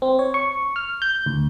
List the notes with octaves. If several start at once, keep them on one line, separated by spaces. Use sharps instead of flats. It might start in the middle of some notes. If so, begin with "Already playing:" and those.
C4
C#5
C#6
F6
G6
D2